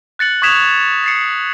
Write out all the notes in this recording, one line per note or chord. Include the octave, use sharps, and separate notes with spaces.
F#6 A6 C#7 F#7
C#6 D#6 G#6 B6 E7 F7
A6 C7 C#7